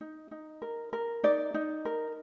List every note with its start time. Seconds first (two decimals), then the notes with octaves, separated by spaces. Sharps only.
0.01 D#4
0.31 D#4
0.62 A#4
0.93 A#4
1.24 D#4 D5
1.54 D#4
1.85 A#4